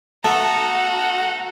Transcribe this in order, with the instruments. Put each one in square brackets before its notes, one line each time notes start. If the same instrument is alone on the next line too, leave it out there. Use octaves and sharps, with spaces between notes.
[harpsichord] A3 B3 [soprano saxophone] F#4 [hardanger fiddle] A4 A#5 [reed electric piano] A5